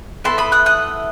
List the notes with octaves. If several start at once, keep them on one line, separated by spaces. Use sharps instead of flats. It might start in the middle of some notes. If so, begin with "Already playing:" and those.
B3 E4 A4 A5 C6
B5 D#6
D#6 F#6
D#6 F#6